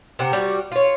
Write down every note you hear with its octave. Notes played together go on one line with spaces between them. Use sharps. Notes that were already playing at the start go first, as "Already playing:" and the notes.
C3 C4 F#5
G3 F#4
F4 C#5